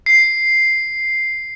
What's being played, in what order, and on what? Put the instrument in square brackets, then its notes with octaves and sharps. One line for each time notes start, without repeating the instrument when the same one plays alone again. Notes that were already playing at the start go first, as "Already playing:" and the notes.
[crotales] C7